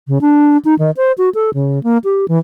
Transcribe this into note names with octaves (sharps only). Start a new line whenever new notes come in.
C#3
D4
D#4
D#3
C5
F#4
A4
C#3
A#3
G4
E3